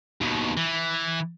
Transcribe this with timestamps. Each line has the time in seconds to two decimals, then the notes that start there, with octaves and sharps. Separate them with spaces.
0.21 D#2 B2
0.57 E3